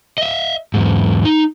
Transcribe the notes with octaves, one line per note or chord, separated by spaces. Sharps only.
D#5 E5
E2 G#2
D#4